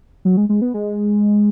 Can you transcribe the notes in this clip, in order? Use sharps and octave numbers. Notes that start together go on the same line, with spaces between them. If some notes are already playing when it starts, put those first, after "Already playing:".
F#3
G#3
G#3
B3
G#3